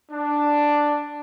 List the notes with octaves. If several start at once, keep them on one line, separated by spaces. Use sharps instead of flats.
D4